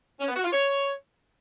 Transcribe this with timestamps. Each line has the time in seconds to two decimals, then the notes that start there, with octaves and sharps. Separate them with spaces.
0.20 C#4
0.28 B3
0.36 F#4
0.44 F4
0.52 C#5